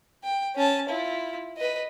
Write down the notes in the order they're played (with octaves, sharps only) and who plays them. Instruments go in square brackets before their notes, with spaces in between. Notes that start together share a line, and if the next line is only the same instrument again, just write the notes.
[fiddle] G5
C#4 A5
E4 F4
B4 D#5